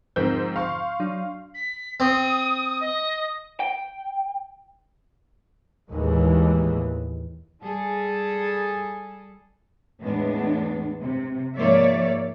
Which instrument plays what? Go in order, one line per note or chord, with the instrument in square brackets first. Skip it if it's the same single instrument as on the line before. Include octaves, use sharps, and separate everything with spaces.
[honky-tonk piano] G#2 C4 G6 [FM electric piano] D3 F3 A#4
[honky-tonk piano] F5 C6 C#6
[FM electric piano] F#3 D4
[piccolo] B6
[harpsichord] C4 [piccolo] D#6
[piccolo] D#5
[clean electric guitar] G5
[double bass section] D#2 A2 E3 G#3
[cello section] G3 G#4 A4
E2 A2 G#3 B3 D4
C3
G#2 F3 A#3 C#5 D5 E5